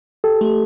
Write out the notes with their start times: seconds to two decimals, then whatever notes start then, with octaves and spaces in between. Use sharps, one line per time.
0.24 G4 A4
0.41 A3